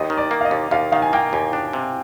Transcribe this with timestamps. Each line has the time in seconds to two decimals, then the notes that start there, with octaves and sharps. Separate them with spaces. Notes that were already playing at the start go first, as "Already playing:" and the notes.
Already playing: D#2 D#5
0.10 D#3
0.17 D5
0.31 A#3
0.41 F5
0.45 D#5
0.51 D#2
0.71 D#2 F5
0.92 D#3 F5
1.02 G#5
1.13 A#3 G5
1.33 D#2 G#5
1.53 D4
1.73 C3